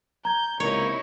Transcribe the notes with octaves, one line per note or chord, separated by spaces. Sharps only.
A#5 G6 G#6
C#2 C3 A#3 D#4 E4 C#5